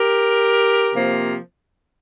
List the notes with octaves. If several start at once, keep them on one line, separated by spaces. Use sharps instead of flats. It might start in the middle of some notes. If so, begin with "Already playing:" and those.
Already playing: G4 A#4
C3 F3 A#3